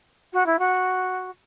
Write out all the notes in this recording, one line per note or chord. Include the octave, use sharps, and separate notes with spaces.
F#4
E4
F#4